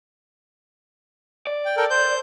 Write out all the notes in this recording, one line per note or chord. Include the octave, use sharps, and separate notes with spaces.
D5
G5
A4 A#4 G5
C5 G6